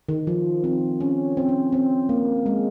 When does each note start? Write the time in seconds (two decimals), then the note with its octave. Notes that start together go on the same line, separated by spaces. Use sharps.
0.09 D#3
0.27 F3
0.64 C4
1.00 C#4
1.37 C4
1.49 C#4
1.72 C4
2.09 A#3
2.46 G#3